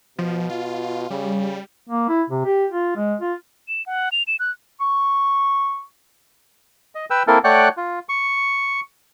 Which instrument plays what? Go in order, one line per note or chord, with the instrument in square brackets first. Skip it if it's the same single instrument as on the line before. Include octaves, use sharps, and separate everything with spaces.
[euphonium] B2 [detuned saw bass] F3
[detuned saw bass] F4
[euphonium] C#3 [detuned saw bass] G3
[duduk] A#3
E4
C3
G4
F4
G#3
F4
[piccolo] E7
F#5
F7
E7
F#6
[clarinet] C#6
[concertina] D#5
B4 G5 E6
A#3 C4 E4 A4 A#4
A3 C#5 D5 F#5 G5 F#6
F4
C#6